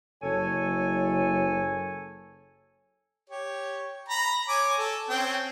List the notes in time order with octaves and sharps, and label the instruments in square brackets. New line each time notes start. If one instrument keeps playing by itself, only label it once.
[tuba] F#1 [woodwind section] A4 C#5 G#5
[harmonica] G4 C#5
A#5 B5
C#5 G#5 D6
A4
C4 C#4 G5